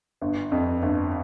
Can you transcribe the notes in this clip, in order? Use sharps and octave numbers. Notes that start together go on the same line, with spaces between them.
G1
F2
G1